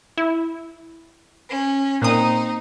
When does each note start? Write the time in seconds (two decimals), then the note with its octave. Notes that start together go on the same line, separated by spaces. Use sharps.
0.18 E4
1.49 C#4
2.02 A#2 C4 D#4 D#6